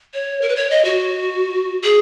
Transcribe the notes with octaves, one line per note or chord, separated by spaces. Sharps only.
C#5
A#4
B4
C#5
D#5
F#4
G#4